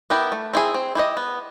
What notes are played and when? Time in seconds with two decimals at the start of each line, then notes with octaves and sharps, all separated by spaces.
0.10 B3 E4 G4 A#4
0.32 A3
0.53 C4 E4 G#4
0.74 C4
0.95 E4 G4 C5 D#5
1.17 B3